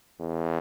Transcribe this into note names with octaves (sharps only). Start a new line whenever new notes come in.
E2